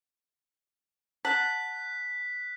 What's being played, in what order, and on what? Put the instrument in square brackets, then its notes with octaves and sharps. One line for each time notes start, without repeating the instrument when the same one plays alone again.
[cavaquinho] F#5 A5 [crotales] F#6 B6